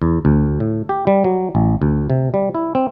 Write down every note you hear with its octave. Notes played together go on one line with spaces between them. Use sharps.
E2
D2
A2
G4
G3
F#3
A1
D2
C3
G3
E4
C4